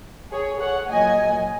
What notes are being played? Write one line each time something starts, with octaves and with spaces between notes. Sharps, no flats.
G#4 C#5
C#5 F#5
A#2 F#3 D#5 G#5